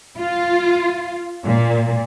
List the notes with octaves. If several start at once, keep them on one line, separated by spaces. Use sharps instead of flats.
F4
A#2